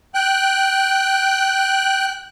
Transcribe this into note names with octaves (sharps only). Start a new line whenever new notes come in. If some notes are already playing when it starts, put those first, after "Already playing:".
G5 F#6